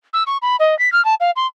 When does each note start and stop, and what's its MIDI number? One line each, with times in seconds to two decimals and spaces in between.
0.14 0.23 88
0.27 0.38 85
0.42 0.56 83
0.60 0.77 75
0.79 0.91 95
0.93 1.03 89
1.05 1.15 81
1.20 1.31 77
1.36 1.47 84